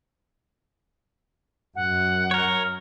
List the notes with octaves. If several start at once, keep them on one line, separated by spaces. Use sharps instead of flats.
F#2 F#5
A#4 C#5